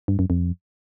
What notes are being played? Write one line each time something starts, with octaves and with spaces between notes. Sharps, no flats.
G2
F#2
F2